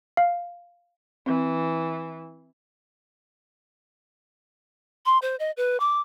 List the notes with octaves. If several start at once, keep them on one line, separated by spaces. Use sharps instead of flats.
F5
E3 C4
C6
C5
D#5
B4
D6